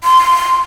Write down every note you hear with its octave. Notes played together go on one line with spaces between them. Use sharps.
C6